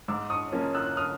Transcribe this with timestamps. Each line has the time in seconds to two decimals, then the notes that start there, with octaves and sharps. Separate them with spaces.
0.08 G#2 D6 E6
0.30 C#6 D#6
0.52 F3 A#3 C#4
0.75 E6 F#6
0.86 F#6
0.97 D#6 F6